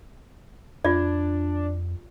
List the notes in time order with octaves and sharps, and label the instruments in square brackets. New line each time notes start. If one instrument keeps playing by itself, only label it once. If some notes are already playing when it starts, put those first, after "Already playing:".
[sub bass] F2 [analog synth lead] D4 [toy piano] F4 D5